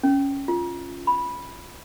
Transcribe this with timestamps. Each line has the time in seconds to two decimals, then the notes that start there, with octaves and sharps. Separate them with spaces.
0.03 C#4
0.48 F4
1.07 B5